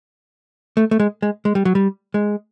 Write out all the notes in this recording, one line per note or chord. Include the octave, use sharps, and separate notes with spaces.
A3
A3
G#3
G#3
G#3
G3
F#3
G3
G#3